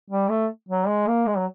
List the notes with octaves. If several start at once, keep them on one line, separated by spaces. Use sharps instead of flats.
G3
A3
F#3
G#3
A#3
G#3
F#3